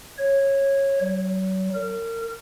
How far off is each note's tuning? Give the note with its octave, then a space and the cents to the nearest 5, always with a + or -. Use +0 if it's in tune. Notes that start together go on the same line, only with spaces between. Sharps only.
C#5 -15
F#3 +35
A#4 -30